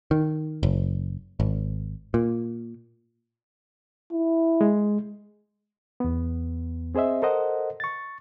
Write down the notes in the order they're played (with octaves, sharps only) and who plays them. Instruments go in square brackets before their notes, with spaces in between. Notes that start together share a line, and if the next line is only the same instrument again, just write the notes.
[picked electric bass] D#3
F#1
G#1
A#2
[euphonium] E4
[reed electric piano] G#3
E2 B3
C4 G#4 C5 D#5 E5
A4 A#4 C5 D#5 F#5
C#6 A6